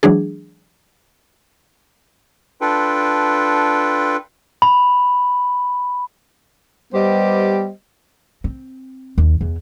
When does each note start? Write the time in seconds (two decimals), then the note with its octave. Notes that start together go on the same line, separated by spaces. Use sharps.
0.03 E3 F#3 G#3 D4 G#4
2.61 D4 F4 A4 B4 G5
4.62 B5
6.93 G3 B3 G4 C5 D#5
8.44 C4
9.18 D#2
9.41 E2